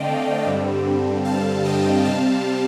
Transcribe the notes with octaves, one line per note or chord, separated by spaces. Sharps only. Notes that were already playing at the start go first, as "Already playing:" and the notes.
Already playing: D3 A3 C4 D5 D#5 F5 G5
G2 D3 G3 C4
F5 A5
D#5 G5
C3 G3 C4 F5 A5